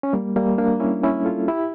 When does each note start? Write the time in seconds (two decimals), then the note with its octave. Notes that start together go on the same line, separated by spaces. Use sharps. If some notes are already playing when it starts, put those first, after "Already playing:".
0.03 C#4
0.13 G3 A#3
0.36 G3 A#3
0.58 A#3 D4
0.80 C#4 E4
1.04 C#4 E4
1.25 F4 A4
1.48 E4 G4